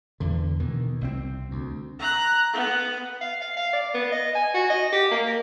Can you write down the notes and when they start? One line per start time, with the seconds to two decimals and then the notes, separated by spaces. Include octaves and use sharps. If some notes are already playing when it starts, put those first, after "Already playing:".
0.20 E2 D3
0.60 B2 D#3 E3
1.01 C2 G3 C4
1.51 D2
1.99 A#5 F#6
2.53 B3
3.21 F5
3.42 F5
3.57 F5
3.73 D5
3.94 B3
4.12 D#5
4.35 G#5
4.54 F#4
4.70 D#5
4.92 G4
5.11 A#3
5.27 A#4